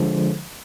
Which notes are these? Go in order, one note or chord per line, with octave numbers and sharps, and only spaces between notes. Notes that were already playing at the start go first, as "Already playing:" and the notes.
Already playing: D3 F3 G#3